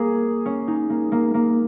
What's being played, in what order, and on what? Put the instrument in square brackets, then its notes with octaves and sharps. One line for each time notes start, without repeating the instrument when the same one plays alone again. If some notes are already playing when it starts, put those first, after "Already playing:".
Already playing: [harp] A#3 [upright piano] G#4
[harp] C#4
D#4
A#3
A#3
A#3